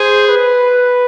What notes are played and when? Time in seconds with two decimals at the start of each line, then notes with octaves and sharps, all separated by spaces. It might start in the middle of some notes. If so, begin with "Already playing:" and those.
Already playing: G#4 C5
0.27 B4